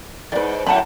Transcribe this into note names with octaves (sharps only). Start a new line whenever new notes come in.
E2 G#2 B4 D5
F#2 A2 F#5 A5 B5